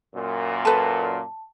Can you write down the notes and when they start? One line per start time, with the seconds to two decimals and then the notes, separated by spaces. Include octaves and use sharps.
0.15 F#2 A#2
0.65 A4 B4 A5